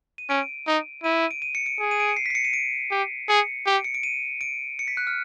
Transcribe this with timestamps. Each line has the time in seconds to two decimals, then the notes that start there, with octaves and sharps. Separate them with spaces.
0.18 D#7
0.29 C#4 D7
0.67 D#4
1.04 E4 D#7
1.31 D7
1.42 D#7
1.55 C#7
1.66 D7
1.79 G#4
1.91 D#7
2.00 D7
2.09 C#7
2.16 C7
2.26 B6
2.30 C7
2.35 C#7
2.45 D#7
2.53 D7
2.91 G4
3.29 G#4 C#7
3.66 G4
3.76 D7
3.84 C#7
3.94 D7
4.03 D#7
4.41 D7
4.79 C#7
4.88 B6
4.97 F#6
5.07 F6